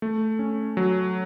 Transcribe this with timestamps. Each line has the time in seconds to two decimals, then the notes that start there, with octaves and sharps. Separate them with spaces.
0.02 A3
0.39 C#4
0.77 F#3